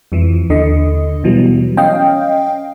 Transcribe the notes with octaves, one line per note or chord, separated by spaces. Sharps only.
F2 E3 F3
D#2 D3 D#5
B2 E3 F#3 G3
C#4 D#5 F5 G5